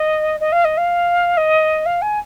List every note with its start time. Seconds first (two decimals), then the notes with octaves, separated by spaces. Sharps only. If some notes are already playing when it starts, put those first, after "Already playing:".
Already playing: D#5
0.40 D#5
0.52 F5
0.65 D#5
0.77 F5
1.37 D#5
1.86 F5
2.02 G#5